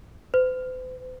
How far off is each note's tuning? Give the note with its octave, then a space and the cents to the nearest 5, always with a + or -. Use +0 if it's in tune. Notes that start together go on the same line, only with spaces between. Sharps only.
C5 -45